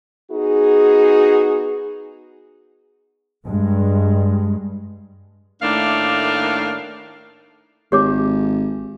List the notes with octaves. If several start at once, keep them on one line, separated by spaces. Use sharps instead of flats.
B3 D#4 F#4 G#4
G2 G#3
A2 D#3 A3 A#3 D4 F5
G#1 G4 C#5 D6